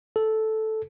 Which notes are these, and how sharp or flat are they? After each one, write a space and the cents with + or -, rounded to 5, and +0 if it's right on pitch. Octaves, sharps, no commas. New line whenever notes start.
A4 -5